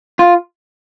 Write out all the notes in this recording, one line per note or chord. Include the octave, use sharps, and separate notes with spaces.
F4